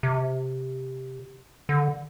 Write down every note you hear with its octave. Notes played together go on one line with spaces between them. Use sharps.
C3
D3